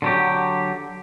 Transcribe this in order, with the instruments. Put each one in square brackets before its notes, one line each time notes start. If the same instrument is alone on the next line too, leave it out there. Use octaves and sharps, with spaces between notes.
[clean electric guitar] D3 F#3 G4